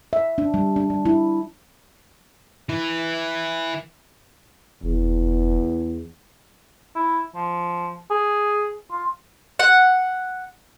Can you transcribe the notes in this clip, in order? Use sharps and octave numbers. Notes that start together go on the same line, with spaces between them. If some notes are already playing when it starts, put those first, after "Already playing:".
E5
D4
G3
D4
G3
E4
E3 E4
F1 E2
E4
F3
G#4
F4
F#5